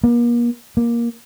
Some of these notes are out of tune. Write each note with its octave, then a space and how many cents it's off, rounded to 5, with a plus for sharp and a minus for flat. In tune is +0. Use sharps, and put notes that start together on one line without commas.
A#3 +40
A#3 +15